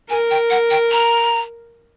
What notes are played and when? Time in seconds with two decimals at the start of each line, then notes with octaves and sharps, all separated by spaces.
0.10 A#4 G#5
0.30 G5
0.50 F#5
0.70 G5
0.91 A#5